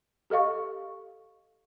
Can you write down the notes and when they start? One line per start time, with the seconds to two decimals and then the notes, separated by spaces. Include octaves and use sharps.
0.30 G4 A4 D#5 F5 C#6